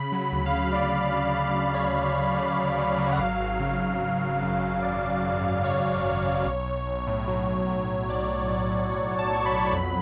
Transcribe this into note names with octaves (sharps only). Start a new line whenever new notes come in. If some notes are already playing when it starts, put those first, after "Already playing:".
Already playing: C#3 B5
F#3
D2
F5
C#3
F#3 D5
F#3
F#3
F#3
D2 F5
D2 C#5
D5
D2
C#5
D2
C#3 D5
D2
C#3
F#3
F#5
G#1 F5
G#1
C#3
G#1
G#1
G#1
F#2
G#1
C#3 D5
C#3
G#1
F#2
G#1 C#5
F#2
G#1
F#2
B1
B1
B1
A2
F#3
A2
F#3
B1
B1 D5
B1
A2 D5
C#5
A2
C#5
A2 C#5
F#3
A5
F#3 C#6
B5
B1
F2